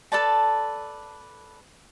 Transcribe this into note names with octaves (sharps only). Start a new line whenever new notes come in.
A4 B4 D5 A5